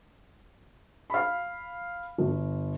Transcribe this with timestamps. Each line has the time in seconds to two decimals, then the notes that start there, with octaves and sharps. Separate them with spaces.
1.10 F5 B5
2.18 G1